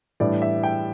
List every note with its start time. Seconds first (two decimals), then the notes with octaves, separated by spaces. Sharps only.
0.20 A2 E3 G3 D4 D5
0.42 E5
0.63 G5